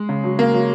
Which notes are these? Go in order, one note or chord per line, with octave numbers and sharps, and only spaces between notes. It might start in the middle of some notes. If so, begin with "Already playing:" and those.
Already playing: G#3
C#3
F#3
C#3 A#3
F#3